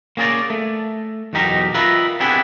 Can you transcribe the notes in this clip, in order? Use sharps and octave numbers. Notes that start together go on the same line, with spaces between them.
A#3 C#4 G#4 A#4 D5
A3
B1 E2 B2 D#4 G4 A#4
F4 A#4 B4 D#5 E5
B3 C4 D4 E4 G4 G#4